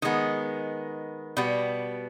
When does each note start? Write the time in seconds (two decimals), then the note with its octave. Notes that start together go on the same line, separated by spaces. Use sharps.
0.02 D#3 G#3 B3
1.37 B2 G3 B3